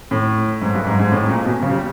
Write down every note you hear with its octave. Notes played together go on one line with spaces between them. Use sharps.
A2
G#2
G2
G#2
G#2
A2
A#2
B2
C#3
G3